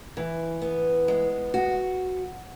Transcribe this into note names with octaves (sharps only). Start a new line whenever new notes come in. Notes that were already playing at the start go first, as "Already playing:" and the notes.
E3
B3
G#3
F#4